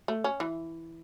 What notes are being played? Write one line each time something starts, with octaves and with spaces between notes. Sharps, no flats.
A3
C#4
E3